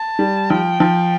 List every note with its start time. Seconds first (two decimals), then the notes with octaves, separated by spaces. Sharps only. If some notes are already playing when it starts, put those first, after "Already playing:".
Already playing: A5
0.19 G3
0.50 F3 G5
0.80 F3